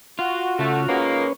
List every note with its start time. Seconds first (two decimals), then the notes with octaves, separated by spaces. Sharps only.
0.19 F4 F#4
0.59 C#3 A3
0.89 D#3 G#3 A#3 C#4 B4 C#5